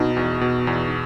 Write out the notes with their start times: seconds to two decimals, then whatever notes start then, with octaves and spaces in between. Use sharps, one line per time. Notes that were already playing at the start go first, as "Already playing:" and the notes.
Already playing: B2 D#4
0.17 E2
0.41 B2
0.67 E2